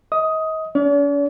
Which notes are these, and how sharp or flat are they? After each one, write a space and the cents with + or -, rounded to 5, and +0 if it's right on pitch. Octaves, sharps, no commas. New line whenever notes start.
D#5 +35 D#6 +10
C#4 +45 D5 -45